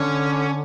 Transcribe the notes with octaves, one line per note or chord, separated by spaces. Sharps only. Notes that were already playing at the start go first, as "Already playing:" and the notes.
Already playing: D3 C#4